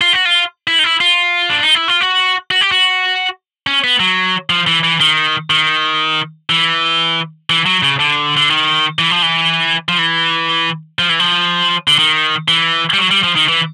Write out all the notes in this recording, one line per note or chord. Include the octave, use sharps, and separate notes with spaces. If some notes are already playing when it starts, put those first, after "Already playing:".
F4
F#4
F4
E4
D#4
E4
F4
D4
D#4
E4
F4
F#4
F#4
G4
F#4
C#4
B3
F#3
F3
E3
E3
D#3
D#3
E3
E3
F#3
C#3
D3
D3
D#3
E3
F3
E3
F3
E3
F3
E3
F3
D3
D#3
E3
G3
F#3
G3
F3
D#3
E3